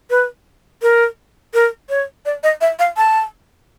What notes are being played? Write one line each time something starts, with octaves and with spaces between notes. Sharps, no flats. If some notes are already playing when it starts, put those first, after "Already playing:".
B4
A#4
A#4
C#5
D5
D#5
E5
F5
A5